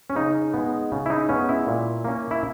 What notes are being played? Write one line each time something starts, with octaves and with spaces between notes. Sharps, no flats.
C#4
C#3 D#4
G#3 B3
C#3
E4
D#4
G#3 B3 C#4
E4
A#2
A#3 C#4
E4